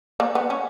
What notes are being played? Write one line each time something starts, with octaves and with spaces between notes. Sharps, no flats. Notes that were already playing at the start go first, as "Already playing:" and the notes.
A#3
B3
C#4